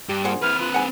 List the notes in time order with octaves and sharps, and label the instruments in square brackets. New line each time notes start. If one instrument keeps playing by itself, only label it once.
[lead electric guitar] G2 [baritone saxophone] G4
[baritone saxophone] A#2 [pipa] G#4 C5 F#5
[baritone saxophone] E3 [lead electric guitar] C4 B4 [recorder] F6
[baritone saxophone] F4 [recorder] F#6
[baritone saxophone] G#2 [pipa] F#5 G#5